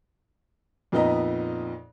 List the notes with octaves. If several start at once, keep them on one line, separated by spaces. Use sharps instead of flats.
F2 A#2 B3 D#4 D#5 A#5